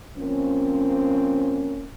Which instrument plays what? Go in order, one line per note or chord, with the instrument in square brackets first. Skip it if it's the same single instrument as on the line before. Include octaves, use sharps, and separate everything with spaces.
[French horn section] F3 A#3 C4 C#4